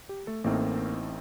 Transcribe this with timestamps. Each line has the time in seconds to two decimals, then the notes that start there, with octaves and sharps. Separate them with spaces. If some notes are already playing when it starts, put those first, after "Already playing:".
0.09 G4
0.27 A3 A4
0.44 A1 A2 A3 A#3 C4 D#4 A#4